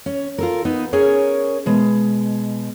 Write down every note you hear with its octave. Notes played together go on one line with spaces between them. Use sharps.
C#4
F4 A4 A#4
B3 D#4
C#4 G#4 A#4 C#5
B2 G#3